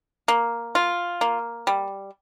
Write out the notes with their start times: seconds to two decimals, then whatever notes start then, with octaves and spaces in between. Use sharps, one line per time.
0.28 A#3
0.75 F4
1.21 A#3
1.67 G3